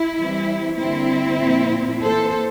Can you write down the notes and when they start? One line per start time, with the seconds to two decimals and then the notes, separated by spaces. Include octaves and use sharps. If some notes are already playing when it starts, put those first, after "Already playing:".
Already playing: E4
0.17 E3 G3 C4
0.79 D3 G3 A#3 C4 E4
1.41 A#2 F3 A#3
2.03 E3 A#3 A4 C5